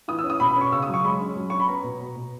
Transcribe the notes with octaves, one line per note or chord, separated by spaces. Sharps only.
E3 D#6
E6
C#4
D#6
B2 B5
B5
C#4
C#6
C#3 E6
D#6
F#3
C#6
G#3 B5
C#4
F#3
C#4 C#6
B5
B3 A#5
B2
B2
B2